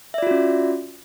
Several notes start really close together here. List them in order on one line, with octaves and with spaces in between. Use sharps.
E5 D5 F4 F#4 C#4